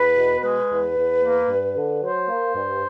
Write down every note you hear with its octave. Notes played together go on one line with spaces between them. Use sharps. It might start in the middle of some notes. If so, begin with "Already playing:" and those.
Already playing: E2 B4
B2
G#3 B4
E2
E2
A#3
G2
D3
F#3 C5
A#3
G2